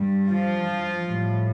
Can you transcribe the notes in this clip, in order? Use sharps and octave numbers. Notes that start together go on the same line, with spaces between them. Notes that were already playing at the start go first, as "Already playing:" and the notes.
Already playing: G2 G3
F3 F4
A2 G3